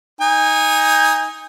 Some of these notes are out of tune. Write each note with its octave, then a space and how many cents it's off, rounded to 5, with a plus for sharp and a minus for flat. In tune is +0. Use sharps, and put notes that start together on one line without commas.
D#4 +15 G#5 -20